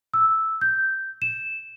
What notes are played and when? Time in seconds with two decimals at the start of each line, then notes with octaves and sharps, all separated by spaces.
0.14 E6
0.61 G6
1.22 E7